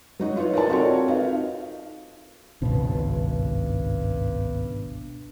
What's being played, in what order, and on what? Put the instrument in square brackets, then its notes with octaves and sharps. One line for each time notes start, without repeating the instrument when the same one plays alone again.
[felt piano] F#3 D#4 F#4
E4 F4 B4 C#5
D#4 F4 A#4 B4 D5 A5
C4 F4 F#4 A4 A#4 C#5
D#4 B4 F5
[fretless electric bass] G#1 C#2 [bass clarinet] G2 [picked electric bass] B2